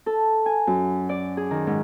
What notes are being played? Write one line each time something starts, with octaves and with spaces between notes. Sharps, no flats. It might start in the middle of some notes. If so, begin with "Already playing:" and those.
A4
G#5
F#2
D5
G#4
D#3
G#2